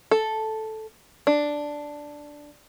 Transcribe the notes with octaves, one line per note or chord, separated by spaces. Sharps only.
A4
D4